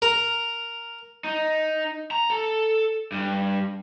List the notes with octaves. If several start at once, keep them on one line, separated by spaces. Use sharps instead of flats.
A#4
D#4
A#5
A4
G2